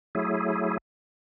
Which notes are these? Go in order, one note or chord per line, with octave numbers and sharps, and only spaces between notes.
F#3 A3 E4 G#4